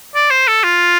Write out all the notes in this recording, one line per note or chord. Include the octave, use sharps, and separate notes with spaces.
D5
C5
A4
F4